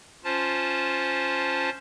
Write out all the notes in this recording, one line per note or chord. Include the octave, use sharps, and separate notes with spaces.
C#4 F4 C5 A5